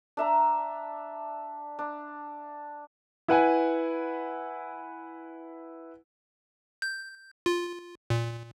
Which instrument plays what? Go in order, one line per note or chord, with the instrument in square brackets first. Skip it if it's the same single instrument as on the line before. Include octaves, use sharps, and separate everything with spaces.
[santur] D4 E5 A#5
D4
[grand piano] E4 B4 F#5 G#5
[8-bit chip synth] G6
F4
A#2